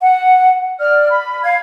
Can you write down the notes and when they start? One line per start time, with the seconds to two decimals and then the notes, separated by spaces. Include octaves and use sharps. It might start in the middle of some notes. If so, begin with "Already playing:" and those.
0.02 F#5
0.79 D5 F6
1.09 B5
1.44 F5 G#6